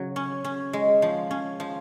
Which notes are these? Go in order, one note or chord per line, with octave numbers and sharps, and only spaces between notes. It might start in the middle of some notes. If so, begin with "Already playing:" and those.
Already playing: C#3 F#3
C#4
C#4
G#3
F3
C#4
F3